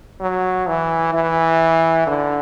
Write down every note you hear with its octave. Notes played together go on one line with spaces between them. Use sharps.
F#3
E3
E3
D3